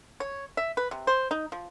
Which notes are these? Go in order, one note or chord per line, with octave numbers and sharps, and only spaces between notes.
C#5
E5
B4
C3
C5
D#4
F3